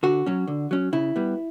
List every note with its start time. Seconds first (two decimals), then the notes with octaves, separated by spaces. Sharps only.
0.03 D3 F#4
0.26 F#3 C#4
0.48 D3
0.71 F#3 C#4
0.93 C#3 E4
1.16 G3 B3